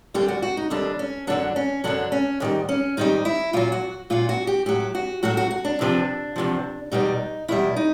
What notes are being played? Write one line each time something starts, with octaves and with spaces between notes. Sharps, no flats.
D#2 D3 G3 G4
F#4
F#4
D#4
D#2 D3 G3 D4
C#4
F#2 D3 F#3 D4
C#4
F#2 D3 F#3 D4
C#4
G#2 D#3 G3
C#4
G#2 D#3 G3 D#4
E4
A#2 F#3 F4
F#4
A#2 F#3 F4
F#4
G4
A2 F#3 G4
F#4
A2 F#3 F#4
F#4
F#4
D4
E2 C3 F3
E2 C3 F3
E2 B2 G3 D#4
E2 B2 G3 E4
D#4